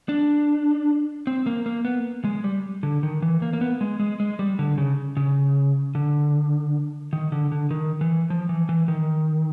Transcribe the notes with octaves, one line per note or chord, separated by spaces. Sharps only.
D4
C4
A#3
A#3
B3
G#3
G3
D3
D#3
E3
A#3
A#3
B3
G#3
G#3
G#3
G3
D3
C#3
C#3
D3
D#3
D3
D3
D#3
E3
F3
E3
E3
D#3